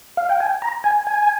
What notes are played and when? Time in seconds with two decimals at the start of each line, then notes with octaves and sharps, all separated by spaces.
0.17 F5
0.29 G5
0.40 G#5
0.62 A#5
0.84 G#5
1.07 G#5